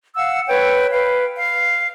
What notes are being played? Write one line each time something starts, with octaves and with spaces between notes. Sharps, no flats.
F5 F#5 E6
B4 C#5 G5
B4 F5
F5